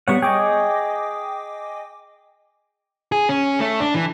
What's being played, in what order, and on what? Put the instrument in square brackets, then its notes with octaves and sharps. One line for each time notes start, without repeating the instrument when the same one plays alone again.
[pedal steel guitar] G3 B3 F#5 [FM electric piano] C#5 C#6
[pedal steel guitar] G#4 D#5 [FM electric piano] G5 D6
[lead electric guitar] G#4
C#4
A3
D4
E3